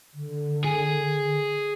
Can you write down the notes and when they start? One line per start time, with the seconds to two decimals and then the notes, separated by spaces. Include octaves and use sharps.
0.14 D3
0.64 G#4